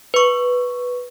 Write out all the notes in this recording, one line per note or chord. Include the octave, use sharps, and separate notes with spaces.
B4 C#6